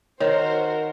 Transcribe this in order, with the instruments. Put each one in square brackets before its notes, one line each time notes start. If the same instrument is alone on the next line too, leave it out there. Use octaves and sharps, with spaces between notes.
[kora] D#3 [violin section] F#4 A#4 C5 [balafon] C#5